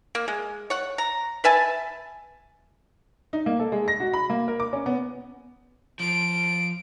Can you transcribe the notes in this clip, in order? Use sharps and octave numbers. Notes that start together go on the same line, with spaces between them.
A#3
G#3
C#5 F#5
A#5
B4 E5 G#5 A5
D#4
A#3
A4
G#3
A#6
F#4
B5
A#3
A#4
D6
C#4
B3
F3 D7